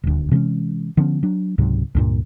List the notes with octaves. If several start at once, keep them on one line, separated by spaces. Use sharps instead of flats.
D#1 D2
C3 E3 G#3 C#4
D3 F3 B3 C#4
F#3 D4
C#2 G#2 C3 F#3
C#2 G2 A#2